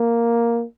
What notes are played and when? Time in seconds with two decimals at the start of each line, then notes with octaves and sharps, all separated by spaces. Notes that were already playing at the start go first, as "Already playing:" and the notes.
Already playing: A#3